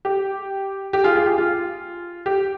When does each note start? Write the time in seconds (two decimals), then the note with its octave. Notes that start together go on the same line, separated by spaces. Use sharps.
0.05 G4
0.93 G4
1.04 F4 G#4
1.15 F4 G#4
1.26 G4
1.38 F4
2.26 G4